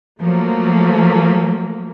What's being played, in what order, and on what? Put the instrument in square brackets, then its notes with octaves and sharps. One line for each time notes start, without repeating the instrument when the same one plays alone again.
[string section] F3 F#3 A3 A#3